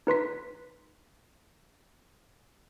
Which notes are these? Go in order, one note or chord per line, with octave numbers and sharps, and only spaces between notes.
D#4 B4 C6 B6